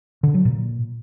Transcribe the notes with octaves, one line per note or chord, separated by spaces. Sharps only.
D3
F#3
A#2